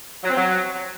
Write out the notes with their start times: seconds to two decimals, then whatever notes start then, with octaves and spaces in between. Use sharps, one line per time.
0.24 F#3
0.30 C4
0.36 F#3